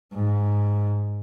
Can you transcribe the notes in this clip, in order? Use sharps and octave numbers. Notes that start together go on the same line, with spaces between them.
G#2